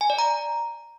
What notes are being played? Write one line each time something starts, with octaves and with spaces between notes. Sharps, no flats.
G#5
D5
A#5